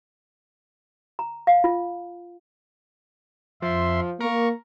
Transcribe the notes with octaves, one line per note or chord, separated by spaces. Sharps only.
A#5
F5
F4
F2 F3 E5 C6
A#3 A#4 C#6